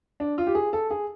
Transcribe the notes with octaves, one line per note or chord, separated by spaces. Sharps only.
D4
F4
G4
G#4
A4
G#4